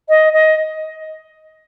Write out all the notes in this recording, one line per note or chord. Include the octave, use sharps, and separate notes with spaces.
D#5
D#5